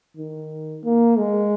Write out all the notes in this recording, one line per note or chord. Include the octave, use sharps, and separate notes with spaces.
D#3
A#3
G#3